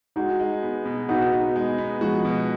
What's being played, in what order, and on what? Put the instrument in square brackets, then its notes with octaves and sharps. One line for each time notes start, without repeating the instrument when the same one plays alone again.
[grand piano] G#3 [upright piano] D#4 F#4
[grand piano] G#3
B3
B2
[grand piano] B3 [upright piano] D#4 F#4
[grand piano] B3
G#3
B3
[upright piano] F3 G#3 [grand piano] F#4
[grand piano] B2